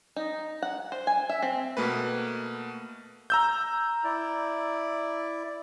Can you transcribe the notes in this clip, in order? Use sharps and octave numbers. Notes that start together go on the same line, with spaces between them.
D#4
F#5
C5
G#5
E5
C4
B2 A3 A#3 B4
A#5 E6 G6
E4 D5